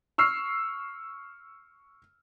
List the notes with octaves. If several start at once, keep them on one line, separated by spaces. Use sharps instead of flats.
C#6 E6 F6 C7